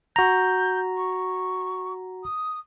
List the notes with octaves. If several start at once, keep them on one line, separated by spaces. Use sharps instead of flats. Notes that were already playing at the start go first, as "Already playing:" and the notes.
F#4 A#5 G6
C#6
D#6